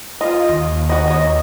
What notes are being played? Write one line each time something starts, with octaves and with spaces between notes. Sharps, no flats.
F4 D#5
D#2
F#4 D#5
C#5 D#5